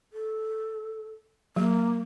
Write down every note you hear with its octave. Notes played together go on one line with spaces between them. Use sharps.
A4
F#3 A#3